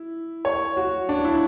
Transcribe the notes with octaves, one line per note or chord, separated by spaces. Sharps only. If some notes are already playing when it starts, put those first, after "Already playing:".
Already playing: E4
C#5
F#4
D4
E4